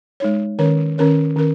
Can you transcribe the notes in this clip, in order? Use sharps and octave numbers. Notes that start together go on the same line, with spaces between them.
G#3 D#4 C#5
D#3 C#4 A#4 C#5
D#3 C#4 A#4 C#5
D#3 C#4 A#4